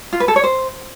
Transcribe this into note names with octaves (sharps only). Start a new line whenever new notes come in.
F4
B4
A4
C#5
C5